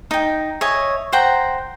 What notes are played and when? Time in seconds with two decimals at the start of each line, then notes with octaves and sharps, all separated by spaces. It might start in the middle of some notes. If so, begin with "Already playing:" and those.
0.11 D#4 G5
0.61 C#5 D#5 E5 G#5
1.13 C5 F#5 G5 A#5